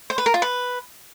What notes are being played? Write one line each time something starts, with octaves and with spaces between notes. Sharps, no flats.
C5
B4
A#4
F4
B4